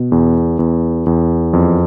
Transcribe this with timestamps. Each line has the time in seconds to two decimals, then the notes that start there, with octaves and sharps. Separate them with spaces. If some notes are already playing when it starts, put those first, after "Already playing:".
Already playing: B2
0.12 E2
0.59 E2
1.06 E2
1.53 F2